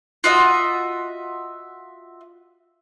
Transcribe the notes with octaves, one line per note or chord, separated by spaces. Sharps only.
F4 F#4 D#5 E5